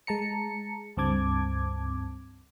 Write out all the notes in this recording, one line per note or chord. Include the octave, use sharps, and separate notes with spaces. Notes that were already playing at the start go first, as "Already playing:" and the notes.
G#3 A5 A#5 C#7
C#2 G2 C4 A5 D6 G#6